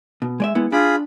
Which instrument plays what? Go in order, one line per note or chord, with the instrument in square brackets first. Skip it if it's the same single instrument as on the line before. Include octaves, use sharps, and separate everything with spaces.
[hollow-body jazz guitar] B2
G#3 D5 E5
G#3 B3 E4
[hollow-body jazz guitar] D4 [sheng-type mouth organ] F4 G#4 B5